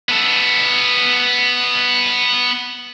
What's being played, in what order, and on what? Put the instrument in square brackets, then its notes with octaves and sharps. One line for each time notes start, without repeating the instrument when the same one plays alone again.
[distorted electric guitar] B3 A4